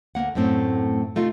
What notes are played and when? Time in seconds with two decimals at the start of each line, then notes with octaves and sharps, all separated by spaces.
0.15 D2 G#2 A#3 F#5
0.35 F#2 A2 A3 C4
1.16 C3 A3 D#4 F4